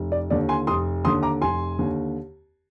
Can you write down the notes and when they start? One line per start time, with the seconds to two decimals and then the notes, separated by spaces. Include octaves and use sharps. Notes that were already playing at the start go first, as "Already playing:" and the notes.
Already playing: F1
0.12 D5
0.30 D#2 D3 D5
0.49 G#5 C6
0.67 F1 C6 D#6
1.05 D#2 D3 C6 D#6
1.23 A#5 D6
1.42 F1 G#5 C6
1.79 D#2 D3